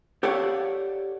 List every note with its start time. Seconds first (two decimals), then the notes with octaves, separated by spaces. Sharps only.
0.23 G4 A4 C#5 D5 F5 F#5